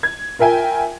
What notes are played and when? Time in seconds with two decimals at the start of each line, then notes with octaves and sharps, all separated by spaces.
0.03 G#6
0.39 F4 A#4 E5 G5 G#5